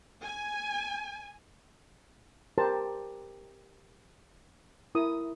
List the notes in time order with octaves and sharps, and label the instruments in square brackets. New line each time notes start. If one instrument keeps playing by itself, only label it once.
[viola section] G#5
[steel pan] G4 A#4 C5 A5
E4 A#4 D#6